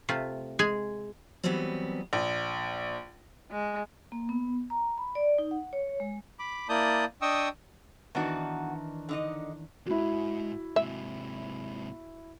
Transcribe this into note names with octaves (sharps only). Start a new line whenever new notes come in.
C3 A3 F4
G#3 G#4 G#5
E3 F#3 G3 B3 C4
A#1
G#3
A#3
B3
A#5
B5
D5
D#4
F#5
C#5
G#3
B5 D6
A#3 E4 D5 A5 D#6 G6
D4 D#5 G5 C#6 D#6 E6
D#3 E3 B3 D4 D#4 F#4
D3 D#4 D#5
F2 G#2 E4 F#4
G#2 C3 E5